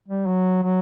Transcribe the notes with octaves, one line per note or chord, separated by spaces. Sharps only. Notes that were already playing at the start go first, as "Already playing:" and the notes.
G3
F#3
F#3